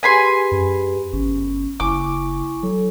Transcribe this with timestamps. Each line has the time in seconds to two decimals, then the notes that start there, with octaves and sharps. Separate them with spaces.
0.03 G4 G#4 B4 G#5 B5 C6
0.51 F#2
1.13 G1 C#4
1.80 F#1 E4 G#5 C#6 D6
2.63 F#3 A4